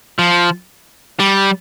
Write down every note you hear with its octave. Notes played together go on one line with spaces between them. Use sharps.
F3
G3